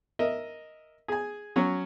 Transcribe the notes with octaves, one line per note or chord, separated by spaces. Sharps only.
A#4 D#5 E5
G#4 G#5
F#3 C#4